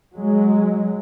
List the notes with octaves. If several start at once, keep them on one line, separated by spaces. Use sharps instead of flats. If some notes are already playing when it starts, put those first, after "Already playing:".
F#3 G#3